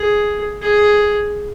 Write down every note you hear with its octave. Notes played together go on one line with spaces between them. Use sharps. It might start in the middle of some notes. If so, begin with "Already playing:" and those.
Already playing: G#4
G#4